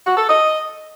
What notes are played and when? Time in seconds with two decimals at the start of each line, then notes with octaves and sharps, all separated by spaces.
0.05 F#4
0.17 A4
0.29 D#5